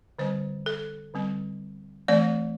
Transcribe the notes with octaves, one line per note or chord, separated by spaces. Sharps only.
D3 G3 C4 C5
A4
D3 G3 C4
E3 A3 C4 D5